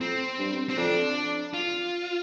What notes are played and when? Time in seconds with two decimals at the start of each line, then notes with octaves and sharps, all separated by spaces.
0.01 F2 C4
0.39 G2
0.69 C4
0.77 F2 D4
1.54 F4